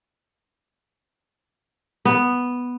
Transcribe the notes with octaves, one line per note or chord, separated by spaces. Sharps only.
B3